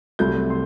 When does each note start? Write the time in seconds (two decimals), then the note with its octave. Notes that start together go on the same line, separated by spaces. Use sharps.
0.19 C2 C3 F#3 A3 G6
0.50 C6